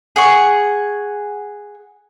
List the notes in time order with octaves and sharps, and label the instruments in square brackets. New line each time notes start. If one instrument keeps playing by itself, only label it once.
[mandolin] G#4 F#5 C#6